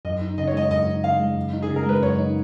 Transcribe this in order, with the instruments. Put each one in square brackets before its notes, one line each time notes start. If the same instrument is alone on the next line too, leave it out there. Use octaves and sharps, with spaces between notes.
[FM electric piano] F#2 [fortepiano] D#5
[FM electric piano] D#4
[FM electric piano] C#3 [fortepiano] D#5
[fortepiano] C#5
[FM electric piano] G#3 [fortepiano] D#5
[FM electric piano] F#2 [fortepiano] D#5
[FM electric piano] D#4
[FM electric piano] C#3 [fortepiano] F5
[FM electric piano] G#3
F#2
D#4
[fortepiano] G#4
[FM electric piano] C#3
[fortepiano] A#4
[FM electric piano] G#3 [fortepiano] B4
[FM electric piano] F#2 [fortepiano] C#5
[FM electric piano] D#4